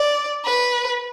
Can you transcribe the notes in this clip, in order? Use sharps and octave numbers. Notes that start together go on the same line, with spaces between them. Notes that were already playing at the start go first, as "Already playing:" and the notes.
Already playing: D5
B4